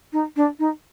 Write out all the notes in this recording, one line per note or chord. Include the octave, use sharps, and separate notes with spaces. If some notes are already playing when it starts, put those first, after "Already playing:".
D#4
D4
D#4